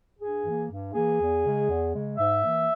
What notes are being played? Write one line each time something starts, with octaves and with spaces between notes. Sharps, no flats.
G2 G#4
E3 A#3
G2
E3 A#3 G#4
E2
C#3 G#3
E2
C#3 G#3
G#2 E5
E3 A#3